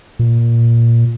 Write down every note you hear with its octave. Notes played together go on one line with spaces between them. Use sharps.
A#2